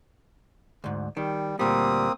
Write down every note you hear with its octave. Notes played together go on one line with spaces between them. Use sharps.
D2 G#2
D#3 G3
D2 A#2 G3 A#3 C4 D#6